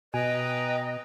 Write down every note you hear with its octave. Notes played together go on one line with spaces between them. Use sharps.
B2 B4 D#5 G5 G#5 A#5